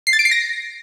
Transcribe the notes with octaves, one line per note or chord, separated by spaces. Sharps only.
C7
A6
D7
C7
A#6